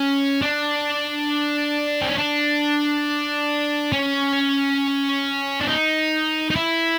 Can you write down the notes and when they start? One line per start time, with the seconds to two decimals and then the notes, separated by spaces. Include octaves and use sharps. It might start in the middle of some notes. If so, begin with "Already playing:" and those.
Already playing: C#4
0.42 D4
2.01 C4
2.09 C#4
2.18 D4
3.92 C#4
5.61 D4
5.68 D#4
6.50 D#4
6.56 E4